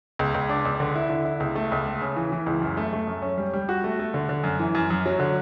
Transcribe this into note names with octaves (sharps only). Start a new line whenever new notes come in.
C#2
C#2
D4
C#2
D3
E4
D3
E4
C#2
A3
C#2
A3
C#3
E3
E3
C#2
F#2
A3
A3
F#2
C#4
G3
G3
F#4
A3
A3
D3
D3
F#2
E3
F#2
F#2
F#3
D3